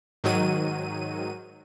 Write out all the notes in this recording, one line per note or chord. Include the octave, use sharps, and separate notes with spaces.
G#2 D#3 F#3 D#7